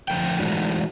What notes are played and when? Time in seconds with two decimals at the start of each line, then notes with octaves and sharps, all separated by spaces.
0.08 D3 F3 A3 G5
0.40 E3 G#3 A3 D4 D#4 F#4